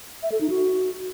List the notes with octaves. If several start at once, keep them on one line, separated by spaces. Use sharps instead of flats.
E5
A4
D#4
F#4